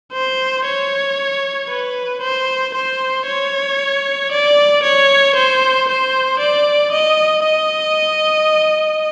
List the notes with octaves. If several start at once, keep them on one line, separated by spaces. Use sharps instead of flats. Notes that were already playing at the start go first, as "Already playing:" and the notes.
C5
C#5
B4
C5
C5
C#5
D5
C#5
C5
C5
D5
D#5
D#5